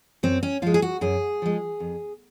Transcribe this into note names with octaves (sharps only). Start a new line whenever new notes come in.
F#2 C4
C#4
F3 G#3 F4
G#4
F#4
F#2 G#4
F3 G#3
F2